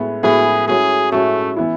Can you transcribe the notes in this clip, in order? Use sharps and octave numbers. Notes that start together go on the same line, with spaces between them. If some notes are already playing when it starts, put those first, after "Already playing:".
Already playing: A2 G#3 B3
A2 G#3 B3 G#4
A2 G#3 C#4 F#4 G#4
A2 G#3 A3 C#4 F#4
E3 B3 E4